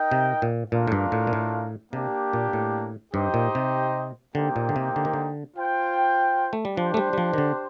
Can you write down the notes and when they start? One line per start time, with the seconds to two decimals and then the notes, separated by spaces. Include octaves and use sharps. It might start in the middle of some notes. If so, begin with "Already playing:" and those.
Already playing: D#4 A#4 D#5 G5
0.11 C3
0.42 A#2
0.72 A#2 A3 D4 F4 A#4 F5
0.87 A2
0.92 G2
1.12 A2
1.27 A#2
1.33 A2
1.93 C3 A#3 D4 G4
2.33 A#2
2.53 A2
3.14 G2 D#4 G4 C5 D#5 G5
3.34 A#2
3.55 C3
4.35 D3 A#3 D#4 G4 C5 G5
4.56 A#2
4.69 D3
4.76 C3
4.96 D3
5.05 D#3
5.14 D3
5.56 F4 C5 G5
6.53 A3
6.65 G3
6.77 F3 D4 G4 C5
6.94 A3
6.97 G3
7.13 G3
7.18 F3
7.33 D#3
7.38 D3